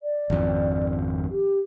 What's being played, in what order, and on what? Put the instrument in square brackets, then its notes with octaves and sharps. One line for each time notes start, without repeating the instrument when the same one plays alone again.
[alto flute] D5
[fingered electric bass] G#1 F2
[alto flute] G4